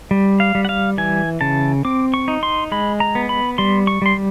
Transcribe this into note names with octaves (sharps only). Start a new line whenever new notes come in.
G3
F5
G3
F#5
F5
E3 G#5
C#3 A5
C4 D6
C#6
D#4
C6
G#3 B5
A#5
B3
B5
G3 C6
C#6
G3 C6